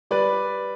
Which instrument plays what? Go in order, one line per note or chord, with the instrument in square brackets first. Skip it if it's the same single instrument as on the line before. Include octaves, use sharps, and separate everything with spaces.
[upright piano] G3 B4 D5